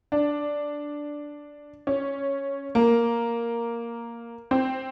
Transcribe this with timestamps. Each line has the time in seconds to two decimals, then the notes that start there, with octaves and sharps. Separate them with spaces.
0.12 D4
1.87 C#4
2.75 A#3
4.51 C4